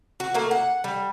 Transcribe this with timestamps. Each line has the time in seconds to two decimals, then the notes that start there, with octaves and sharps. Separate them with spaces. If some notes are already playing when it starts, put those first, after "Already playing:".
0.20 F#4
0.34 A3 A#3
0.51 F#5
0.84 G3